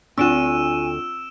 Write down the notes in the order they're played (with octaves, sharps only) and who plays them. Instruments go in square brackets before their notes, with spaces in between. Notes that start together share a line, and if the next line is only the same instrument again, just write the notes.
[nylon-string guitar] D2 D4 [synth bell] C4 F4 [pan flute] G#5 [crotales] E6 D7 E7